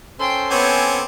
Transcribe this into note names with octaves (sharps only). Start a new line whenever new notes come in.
C#4 A4 C5 G5 C6
B3 C4 C#5 G#5 D6